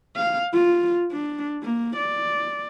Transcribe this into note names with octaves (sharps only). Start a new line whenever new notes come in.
F5
F4
D4
A#3
D5